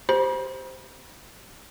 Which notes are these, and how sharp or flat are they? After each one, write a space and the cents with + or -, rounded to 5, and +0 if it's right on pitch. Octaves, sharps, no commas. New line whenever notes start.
G4 +0 C5 +0 B5 -45